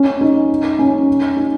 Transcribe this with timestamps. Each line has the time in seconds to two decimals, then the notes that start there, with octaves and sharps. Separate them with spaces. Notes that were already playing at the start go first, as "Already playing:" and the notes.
Already playing: C#4
0.21 D#4
0.79 C#4
1.37 D#4